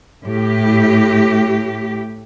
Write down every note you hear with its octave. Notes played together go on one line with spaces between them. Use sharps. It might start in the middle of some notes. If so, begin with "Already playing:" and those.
A2 G4